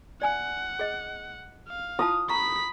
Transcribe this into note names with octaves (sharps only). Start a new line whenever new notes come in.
D5 F#5 G#5
G#4 D#5
F5
E4 F4 A5 D#6
A#5 B5 C#6 B6